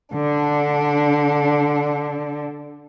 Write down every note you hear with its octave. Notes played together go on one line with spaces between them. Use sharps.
D3 D4